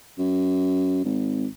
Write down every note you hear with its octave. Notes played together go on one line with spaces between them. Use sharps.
F#2
G#1